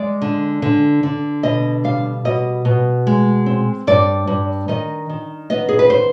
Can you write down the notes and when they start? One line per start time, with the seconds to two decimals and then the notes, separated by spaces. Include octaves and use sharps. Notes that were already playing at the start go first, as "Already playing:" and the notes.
Already playing: G#3 D5
0.22 D3
0.62 D3
1.03 D3
1.43 B2 D#5
1.84 G3 F5
2.25 B2 D#5
2.65 B2
3.07 G#3
3.46 C4
3.87 G2 D5
4.27 G2
4.68 D#3 D#5
5.10 D#3
5.50 B3 D#5
5.69 G#4
5.79 B4
5.90 C5